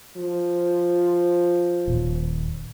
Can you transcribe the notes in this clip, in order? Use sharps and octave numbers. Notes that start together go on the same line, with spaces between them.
F3
D#1